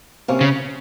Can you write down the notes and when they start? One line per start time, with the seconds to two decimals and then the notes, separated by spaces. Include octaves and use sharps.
0.28 C3 F3 A#3 C#4
0.41 C#3